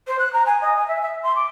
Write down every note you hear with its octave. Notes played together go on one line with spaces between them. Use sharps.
C5
F#6
A#5
G#5
D#5
G#5
E5
E5
C6
D6